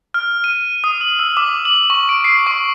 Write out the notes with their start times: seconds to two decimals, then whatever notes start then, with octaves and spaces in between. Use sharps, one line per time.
0.14 F6
0.44 D#7
0.84 D#6
1.01 F#7
1.19 E6
1.37 D6
1.65 F#7
1.90 C#6
2.09 D7
2.24 C7
2.47 C#6